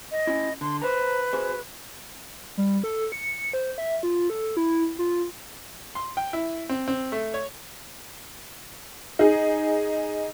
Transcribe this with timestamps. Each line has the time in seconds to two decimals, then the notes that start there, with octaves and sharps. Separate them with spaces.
0.12 D#5
0.27 C#4 E4
0.61 D3 C6
0.82 B4 C5 A#5
1.33 F#4 G#4 C5
2.58 G3
2.84 A4
3.12 C#7
3.53 C5
3.78 E5
4.03 F4
4.30 A4
4.57 E4
4.99 F4
5.95 C6
6.17 G5
6.33 E4
6.69 C4
6.88 C4
7.12 A3
7.34 C#5
9.19 D#4 G#4